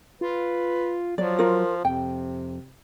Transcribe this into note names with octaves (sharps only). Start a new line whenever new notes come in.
F4 B4
F3 F#3 D5
F4 A#4
F2 C3 G5